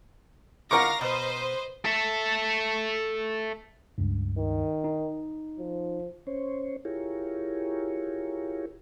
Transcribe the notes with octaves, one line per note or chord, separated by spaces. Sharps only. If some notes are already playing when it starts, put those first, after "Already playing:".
D#3 F4 A#4 F5 F#5 C#6 D6 A#6
B2 B4 C5 D#5
A4 E5
C#2 G2
D#3
D#4
F3
C#4 C5 C#5
E4 F4 G4 G#4 A#4 C#5